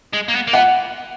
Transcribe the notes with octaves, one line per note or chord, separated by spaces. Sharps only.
G#3
A#3
B3
A#3
B3 F#5